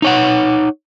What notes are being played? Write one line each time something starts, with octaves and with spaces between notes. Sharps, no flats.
D#4 C#5 F#5